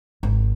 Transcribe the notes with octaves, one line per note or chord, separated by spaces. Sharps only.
G#1